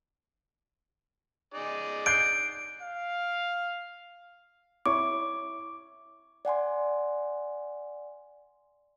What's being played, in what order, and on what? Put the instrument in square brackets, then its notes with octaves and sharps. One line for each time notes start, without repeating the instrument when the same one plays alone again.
[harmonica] D#4 G#4 D5
[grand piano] F#6 G6 C7 [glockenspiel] D7
[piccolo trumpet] F5
[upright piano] E4 C#5 C#6 [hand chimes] D6
[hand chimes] D5 F#5 G#5 C6